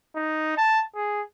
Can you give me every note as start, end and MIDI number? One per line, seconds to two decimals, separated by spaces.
0.15 0.55 63
0.57 0.81 81
0.95 1.21 68